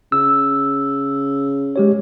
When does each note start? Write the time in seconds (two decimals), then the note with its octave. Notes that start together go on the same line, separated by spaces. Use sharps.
0.12 C#3 E6
1.76 G#3 G4 C#5